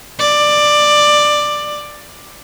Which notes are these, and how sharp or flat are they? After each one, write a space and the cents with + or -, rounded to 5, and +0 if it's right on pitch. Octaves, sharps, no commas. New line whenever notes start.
D5 +15